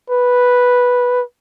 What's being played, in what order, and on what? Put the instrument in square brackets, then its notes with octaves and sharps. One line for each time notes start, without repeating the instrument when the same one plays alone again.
[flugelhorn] B4